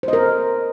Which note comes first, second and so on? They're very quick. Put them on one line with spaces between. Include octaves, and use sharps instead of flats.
C5 D#5 A#4